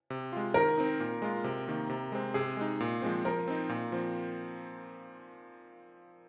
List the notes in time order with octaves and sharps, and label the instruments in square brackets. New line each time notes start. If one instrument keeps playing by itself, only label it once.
[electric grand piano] C3
G#3 F4
[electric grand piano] D#3 [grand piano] A#4
[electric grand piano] C4 D#4
A#2
G#3 F4
C3
D#3 A#3
C3
G#3 C4
[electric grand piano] C3 [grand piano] G#4
[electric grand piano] G#3 D#4
A#2
F3 G#3 C4
[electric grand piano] F3 [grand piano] A#4
[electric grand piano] C4 D#4
A#2
F3 C4